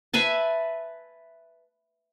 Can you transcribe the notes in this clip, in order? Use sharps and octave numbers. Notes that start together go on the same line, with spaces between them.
B4 E5 G#5 A5